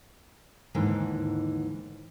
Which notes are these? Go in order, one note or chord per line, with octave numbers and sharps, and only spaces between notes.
D#2 G#2 D3 E3